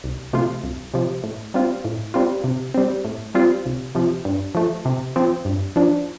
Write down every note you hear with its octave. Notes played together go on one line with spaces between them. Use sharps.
C2
C3 F3 A3 F4
C2
C3 F3
A2
G3 C4 F4
A2
G3 C4 F4
C3
G3 C4
A2
G3 C4 F4
C2
C3 F3
G2
F3 A3
C3
F3 C4
G2
F3 D4